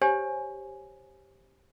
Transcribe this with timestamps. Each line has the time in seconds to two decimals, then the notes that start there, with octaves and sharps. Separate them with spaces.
0.01 G4 C5 C#5 G#5